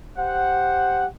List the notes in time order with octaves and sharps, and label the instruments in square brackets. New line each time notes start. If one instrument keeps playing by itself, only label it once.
[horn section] G4 C5 F#5